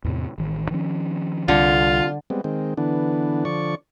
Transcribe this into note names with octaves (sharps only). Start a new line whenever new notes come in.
E2 A2 C3
A1 D#3
D#3 F3 C#4
C2 D3 G3 F4
G3 G#3 B3 C4
D#3 G#3 C4
D3 E3 B3 D4
D3 F3 D5 C#6